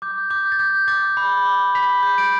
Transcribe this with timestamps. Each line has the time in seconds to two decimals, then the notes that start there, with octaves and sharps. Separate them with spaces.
0.02 D6 G6
0.30 D6 G6
0.52 A6
0.59 D6 G6
0.88 D6 A6
1.17 B5
1.45 D6
1.75 B5 B6
2.03 G6
2.18 D7